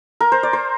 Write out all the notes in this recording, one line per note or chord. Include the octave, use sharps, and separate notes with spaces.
A#4
C5
D5
C5